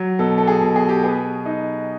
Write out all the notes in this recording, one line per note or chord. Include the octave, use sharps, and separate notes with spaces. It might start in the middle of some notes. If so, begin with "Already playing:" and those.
Already playing: F#3
B2 A4
A4
G#4
B2
G#4
G4
B3 G#4
D#4